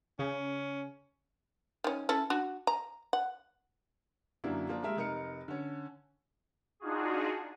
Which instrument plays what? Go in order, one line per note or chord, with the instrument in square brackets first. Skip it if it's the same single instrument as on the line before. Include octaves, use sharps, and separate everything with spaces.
[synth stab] C#3 [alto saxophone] C#4
[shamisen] D#3 C#4
C#4 E4 A4
D4 F#4
A#5
F#5
[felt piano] F#2 D3 F#3 A#3 D4 E4
F3 A#3 D4
G3 G#3 A#3 A#4 E5
F1 D#4 A#4 D#5 C#7
D3 C#4
[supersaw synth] D4 D#4 F4 F#4 G#4